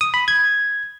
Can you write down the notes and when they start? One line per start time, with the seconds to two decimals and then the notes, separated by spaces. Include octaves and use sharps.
0.01 D#6
0.14 B5
0.28 G#6